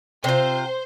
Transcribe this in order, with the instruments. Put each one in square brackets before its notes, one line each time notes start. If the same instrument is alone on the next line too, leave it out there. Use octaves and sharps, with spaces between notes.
[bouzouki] C3 F4 [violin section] C5